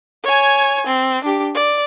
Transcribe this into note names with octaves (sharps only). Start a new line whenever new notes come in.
C#5 G#5
C4
D4 G4
D5